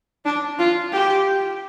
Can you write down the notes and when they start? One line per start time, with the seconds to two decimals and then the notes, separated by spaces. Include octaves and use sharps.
0.25 D4
0.59 F4
0.93 G4